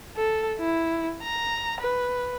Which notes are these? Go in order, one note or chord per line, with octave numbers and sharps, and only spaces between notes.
A4
E4
A#5
B4